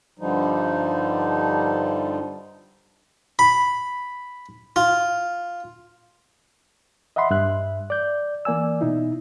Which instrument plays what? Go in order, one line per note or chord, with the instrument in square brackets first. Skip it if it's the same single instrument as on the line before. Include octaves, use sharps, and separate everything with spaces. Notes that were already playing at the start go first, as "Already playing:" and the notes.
[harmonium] G2 D3 F3 G3 D#4
[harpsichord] B5
F4
[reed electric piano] D#5 E5 F#5 B5 C6
G2 E5 F#6
D5 G6
E3 A#3 D5 G#5 E6
B2 D#4 E4